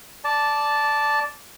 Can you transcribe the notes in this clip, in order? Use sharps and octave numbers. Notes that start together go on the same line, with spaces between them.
D5 A5